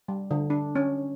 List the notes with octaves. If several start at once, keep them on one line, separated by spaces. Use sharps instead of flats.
G3
D3
D4
C#4